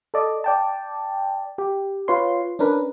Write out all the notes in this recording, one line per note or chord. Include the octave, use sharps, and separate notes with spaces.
A4 D5 D#5
D5 G5 A5
G4
F4 B4 C#5 C6
C#4 D4 A#4 B4